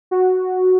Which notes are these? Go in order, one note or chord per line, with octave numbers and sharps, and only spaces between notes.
F#4